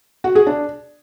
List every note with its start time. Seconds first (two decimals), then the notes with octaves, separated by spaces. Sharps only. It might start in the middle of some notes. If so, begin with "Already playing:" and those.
0.24 F#4
0.35 G#4
0.47 D4